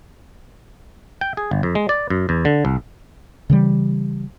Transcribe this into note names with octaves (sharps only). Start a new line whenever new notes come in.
G5
G#4
G1
F2
G#3
D5
F#2
E2
D3
C2
C#3 E3 G3